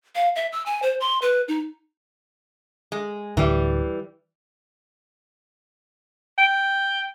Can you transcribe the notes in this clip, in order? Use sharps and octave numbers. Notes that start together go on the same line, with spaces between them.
F5
E5
E6
G#5
C5
C6
B4
D#4
G#3
D1 A2 D3 E3 G3
G5